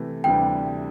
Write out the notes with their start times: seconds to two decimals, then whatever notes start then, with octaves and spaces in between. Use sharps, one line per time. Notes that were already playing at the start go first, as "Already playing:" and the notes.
Already playing: C3 E3 A3
0.24 D2 C3 E3 G3 D4 G5